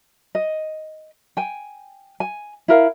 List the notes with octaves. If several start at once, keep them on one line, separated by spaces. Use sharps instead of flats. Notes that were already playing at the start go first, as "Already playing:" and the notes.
D#5
G5 G#5
G#5
E4 A#4 F5